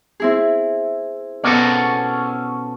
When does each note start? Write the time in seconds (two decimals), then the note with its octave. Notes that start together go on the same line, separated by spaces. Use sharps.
0.20 C4 E4 G#4
1.44 B2 C#4 F#4 A4 D5